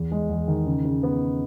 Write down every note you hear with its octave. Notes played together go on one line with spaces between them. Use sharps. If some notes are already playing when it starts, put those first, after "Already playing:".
Already playing: E2
G#3
E2
D#3
C#3
C#3
B3